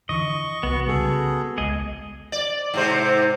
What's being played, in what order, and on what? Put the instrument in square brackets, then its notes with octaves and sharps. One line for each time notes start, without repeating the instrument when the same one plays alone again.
[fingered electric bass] D3 E3 [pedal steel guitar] D#5 [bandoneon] C#6
[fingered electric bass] C2 [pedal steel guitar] B3 F#4
[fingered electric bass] C#3 G3 [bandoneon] G#4 A4
[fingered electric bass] C#2 G#3 [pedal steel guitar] G#4 D#5
[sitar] D5
G#2 C3 C5